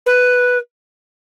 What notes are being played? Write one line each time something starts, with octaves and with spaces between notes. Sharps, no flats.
B4